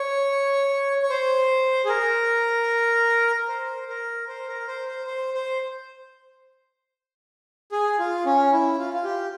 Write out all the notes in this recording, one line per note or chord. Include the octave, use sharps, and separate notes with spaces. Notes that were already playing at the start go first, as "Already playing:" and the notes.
Already playing: C#5
C#5
C5
G#4
A#4
C5
A#4
C5
A#4
C5
C5
C5
C5
G#4
F4
C#4
E4
F4
F4
G4